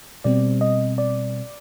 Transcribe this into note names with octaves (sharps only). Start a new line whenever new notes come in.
B2 G3 C4 D5
D#5
D5